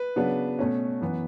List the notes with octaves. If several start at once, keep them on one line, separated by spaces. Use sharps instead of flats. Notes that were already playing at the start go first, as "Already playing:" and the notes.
Already playing: B4
C#3 F#3 B3 D4
B2 A3 C#4
F#2 E3 B3